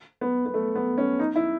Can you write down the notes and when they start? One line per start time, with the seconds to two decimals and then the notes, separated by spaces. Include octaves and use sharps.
0.21 B3
0.46 B3
0.54 A3
0.75 B3
0.98 C#4
1.19 D#4
1.36 E4